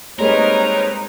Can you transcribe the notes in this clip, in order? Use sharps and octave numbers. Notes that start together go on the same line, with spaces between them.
G3 G#3 A#3 C4 D#4 A#4 B4 C#5